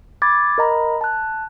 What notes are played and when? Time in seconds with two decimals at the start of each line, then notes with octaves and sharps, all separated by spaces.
0.22 B5 D6 G#6 A6
0.58 A#4 D#5 A#5 B5
1.01 A5 F#6